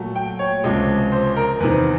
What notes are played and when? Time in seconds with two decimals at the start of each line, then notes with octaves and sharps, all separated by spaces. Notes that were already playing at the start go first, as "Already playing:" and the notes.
Already playing: A#2 F#3 A3
0.16 G5
0.39 C#5
0.64 C#2 C3 F3 G#3
1.12 C5
1.36 A#4
1.60 E2 C3 D#3 B4